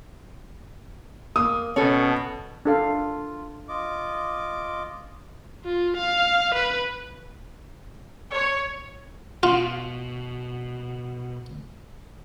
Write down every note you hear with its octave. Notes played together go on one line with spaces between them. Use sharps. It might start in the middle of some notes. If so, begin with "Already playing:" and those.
A#3 D#6
B2 C#4 A4
D4 F4 A4 F5
F4 D#5 D6
F4
F5
B4
C#5
B2 F4